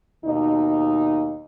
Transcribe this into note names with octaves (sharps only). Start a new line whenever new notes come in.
D#2 B2 D#4